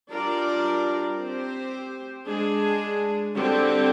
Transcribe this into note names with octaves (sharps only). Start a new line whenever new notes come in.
G3 D4 F4 A#4 D5
C4 G4 C5
G#3 D4 G#4
D3 G3 C4 G4